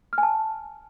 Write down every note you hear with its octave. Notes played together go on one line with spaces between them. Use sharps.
F6
G#5
A5